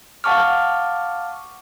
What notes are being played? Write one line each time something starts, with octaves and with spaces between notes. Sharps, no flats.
F5 F#5 A5 C#6 D6 F6